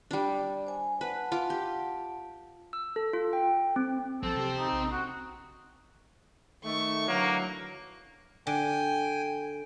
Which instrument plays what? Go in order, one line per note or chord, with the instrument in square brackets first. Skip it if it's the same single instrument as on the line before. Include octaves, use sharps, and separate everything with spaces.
[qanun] G3 D4 [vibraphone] D5
[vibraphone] C5 G#5
[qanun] B4 [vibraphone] F#5 A5
[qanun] F4 D6
G4
[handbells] E6
A4
F4
G5
C4
[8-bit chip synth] A1 F3 A6 [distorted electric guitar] C4 [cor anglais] A4
[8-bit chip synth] C3 G4
[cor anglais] D#4
[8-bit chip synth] A#1
[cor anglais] F#4
[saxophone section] D#3 A3 [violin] C#6
[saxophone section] D3 E3 F#3 [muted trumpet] A#3
[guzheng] D3 [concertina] G5 G#5